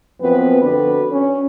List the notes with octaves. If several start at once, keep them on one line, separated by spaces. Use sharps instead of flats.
F#2 F3 B3 C4 B4
D3 D4 F#4 B4
C#4